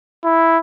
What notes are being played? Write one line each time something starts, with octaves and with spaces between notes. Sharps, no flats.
E4